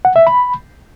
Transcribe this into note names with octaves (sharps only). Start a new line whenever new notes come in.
F#5
E5
B5